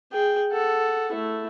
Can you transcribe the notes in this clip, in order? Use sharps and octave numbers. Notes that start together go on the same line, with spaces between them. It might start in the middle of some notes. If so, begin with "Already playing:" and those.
G#4 G5
A4 F#5
A3 E4